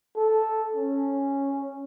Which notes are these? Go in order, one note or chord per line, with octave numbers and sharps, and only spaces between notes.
A4
C#4